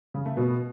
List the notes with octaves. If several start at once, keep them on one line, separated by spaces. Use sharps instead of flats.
C#3
A3
B2